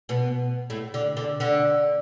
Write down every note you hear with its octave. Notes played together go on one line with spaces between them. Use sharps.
B2 B3
A2 A3
D3
D3
D3